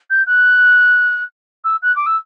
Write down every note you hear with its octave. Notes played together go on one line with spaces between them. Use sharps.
G6
F#6
E6
F#6
D6
E6